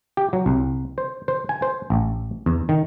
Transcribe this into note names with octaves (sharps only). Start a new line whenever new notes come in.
G4
F#3
C2
C5
C5
G#5
C5
A1
E2
D#3